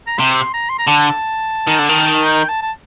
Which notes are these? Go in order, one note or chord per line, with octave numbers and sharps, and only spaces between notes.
A#5
C3 C6
A#5
C6
A#5
D3 A5
D#3
D3
D#3
G5
A5
A5